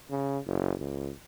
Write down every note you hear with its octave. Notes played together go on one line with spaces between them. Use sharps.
C#3
F#1
C#2